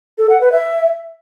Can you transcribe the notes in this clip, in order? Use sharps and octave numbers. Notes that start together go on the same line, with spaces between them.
A4
F#5
B4
E5